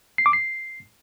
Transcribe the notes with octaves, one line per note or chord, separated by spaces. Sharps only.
C7
D6
C7